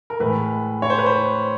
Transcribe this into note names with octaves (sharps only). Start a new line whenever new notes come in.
A#4
A2 E3 G#3 B4
C#5
C5
B4
C5